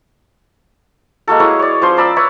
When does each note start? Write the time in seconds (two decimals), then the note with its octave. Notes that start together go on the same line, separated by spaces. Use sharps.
1.27 G#3 A#3 F#4 A4
1.40 E4 G#4 B4 C#5
1.59 C#5 D5
1.82 F3 C#4 C5 C6
1.97 A#4 D5 B5 E6
2.16 B4 C#5 E5